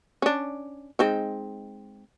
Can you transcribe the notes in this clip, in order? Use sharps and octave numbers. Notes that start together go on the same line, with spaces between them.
C#4 D4
G#3 C4 D#4